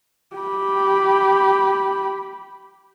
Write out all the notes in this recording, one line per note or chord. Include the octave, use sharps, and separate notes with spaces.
G4 B5